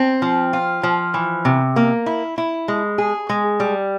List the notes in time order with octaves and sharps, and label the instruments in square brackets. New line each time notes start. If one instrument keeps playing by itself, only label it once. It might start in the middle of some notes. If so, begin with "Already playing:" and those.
Already playing: [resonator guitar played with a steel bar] C4
F3
F4
F3
E3
C3
A#3
E4
E4
G#3
G#4
G#3
G3